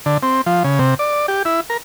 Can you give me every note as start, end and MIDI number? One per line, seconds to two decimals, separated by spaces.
0.06 0.18 50
0.23 0.41 60
0.46 0.63 53
0.64 0.79 49
0.79 0.94 48
0.99 1.26 74
1.28 1.43 67
1.45 1.60 64
1.70 1.77 70